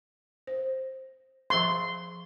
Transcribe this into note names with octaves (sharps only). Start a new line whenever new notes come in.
C5
F3 G#4 C6 C#6